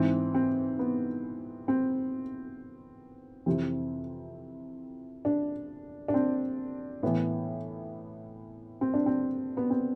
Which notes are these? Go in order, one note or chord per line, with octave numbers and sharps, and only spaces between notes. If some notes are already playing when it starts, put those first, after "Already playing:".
Already playing: G#2 E3 C4
C4
B3
C4
F2 C3 E3 C4
D4
D4
C4
A2 E3 B3
C4
D4
C4
B3
C4